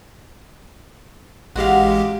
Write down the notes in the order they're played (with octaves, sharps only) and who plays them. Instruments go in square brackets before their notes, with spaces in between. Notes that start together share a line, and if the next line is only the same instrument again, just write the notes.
[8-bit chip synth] A1 G#3 G4 [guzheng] F#4 F5